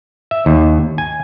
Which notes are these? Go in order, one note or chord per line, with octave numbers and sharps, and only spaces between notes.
E5
D#2
G#5